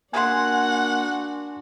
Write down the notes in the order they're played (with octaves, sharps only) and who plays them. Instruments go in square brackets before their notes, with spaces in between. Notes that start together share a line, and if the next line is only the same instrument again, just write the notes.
[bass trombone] A#3 [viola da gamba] D4 F#4 [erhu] F#5 [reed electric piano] G#5 C6